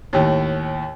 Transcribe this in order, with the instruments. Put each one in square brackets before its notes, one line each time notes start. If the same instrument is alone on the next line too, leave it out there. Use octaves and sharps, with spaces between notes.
[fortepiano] D#2 A2